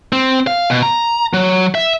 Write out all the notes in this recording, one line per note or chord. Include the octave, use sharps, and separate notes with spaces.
C4
F5
B2
A#5
F#3
E5